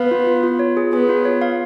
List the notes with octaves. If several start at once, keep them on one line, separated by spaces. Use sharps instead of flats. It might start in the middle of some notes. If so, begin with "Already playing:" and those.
Already playing: B3 F5
F4
F4
F4
C#5
G#4
B3 G#4
F4
C#5
F5